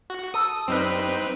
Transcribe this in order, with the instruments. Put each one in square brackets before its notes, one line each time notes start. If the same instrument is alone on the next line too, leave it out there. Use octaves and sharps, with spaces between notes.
[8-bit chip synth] F#4
[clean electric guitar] A4 [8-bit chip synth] D#6
[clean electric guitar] F#2 G3 [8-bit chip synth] C4 D#4 B4